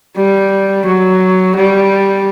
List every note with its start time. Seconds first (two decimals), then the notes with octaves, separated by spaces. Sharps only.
0.17 G3
0.85 F#3
1.56 G3